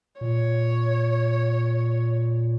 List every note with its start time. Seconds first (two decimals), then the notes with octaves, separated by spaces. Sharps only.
0.21 A#2 C#5